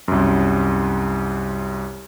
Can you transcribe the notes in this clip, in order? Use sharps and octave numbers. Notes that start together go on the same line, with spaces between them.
C2 F#2